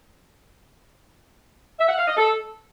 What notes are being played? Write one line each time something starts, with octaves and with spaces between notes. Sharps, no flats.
E5
F#5
F5
D#5
A4